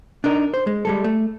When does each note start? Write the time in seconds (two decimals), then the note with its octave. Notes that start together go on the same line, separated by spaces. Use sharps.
0.24 D4 D#4 A#4
0.54 C5
0.67 G#3
0.85 G3 G#3 A4
1.04 A3